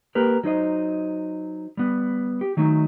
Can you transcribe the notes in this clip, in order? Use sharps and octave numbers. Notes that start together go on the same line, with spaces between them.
A#3 G4 A#4 B4
F#3 D#4 C5 D#5
G3 B3
G4
D#3 F#3 A3 D#4